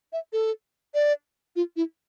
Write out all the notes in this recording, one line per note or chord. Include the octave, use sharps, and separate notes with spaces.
E5
A4
D5
F4
E4